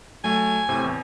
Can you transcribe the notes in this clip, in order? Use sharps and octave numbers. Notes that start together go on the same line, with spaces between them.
F#3 A3 G#5
A2 C3 C4
E2